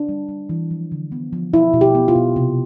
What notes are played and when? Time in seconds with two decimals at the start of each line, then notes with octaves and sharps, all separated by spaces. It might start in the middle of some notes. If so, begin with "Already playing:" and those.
Already playing: D4
0.09 G3
0.29 G3
0.49 E3
0.71 F3
0.92 D3
1.12 B3
1.33 F3
1.53 B2 E4
1.74 B2
1.81 G4
1.95 B3
2.08 F4
2.16 B2
2.36 C3